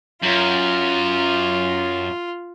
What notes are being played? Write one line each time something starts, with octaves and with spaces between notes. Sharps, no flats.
F#2 F4